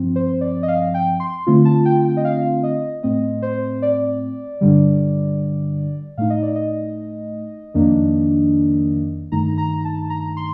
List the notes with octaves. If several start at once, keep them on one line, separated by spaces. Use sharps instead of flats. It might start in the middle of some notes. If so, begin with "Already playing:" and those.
Already playing: G2 F3 C4
C5
D5
D#5
F5
G5
C6
D3 A3 C4 F4
A5
G5
G5
D#5
F5
D#5
A2 A3 C4 D#5
C5
D5
G2 D3 G3
A2 A3 D#4 F5
D#5
D5
D#5
F2 D#3 A#3 D4
G2 D#3 A3 D#4 A#5
A#5
A5
A#5
C6